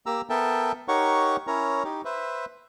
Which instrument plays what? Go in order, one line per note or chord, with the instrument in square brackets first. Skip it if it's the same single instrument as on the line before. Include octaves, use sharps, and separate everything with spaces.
[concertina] A#3 G4 A#5 E6
B3 A4 A#4 E5 G5 A5
D#4 G4 A#4 C#5 F#5 C#6
C#4 E4 A#4 C#5 A#5
D#4 G4
B4 C5 E5